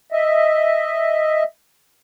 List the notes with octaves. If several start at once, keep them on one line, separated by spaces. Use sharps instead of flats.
D#5 E5